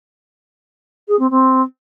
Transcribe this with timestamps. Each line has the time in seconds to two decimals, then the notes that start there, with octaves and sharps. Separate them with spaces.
1.08 G#4
1.19 C4
1.30 C4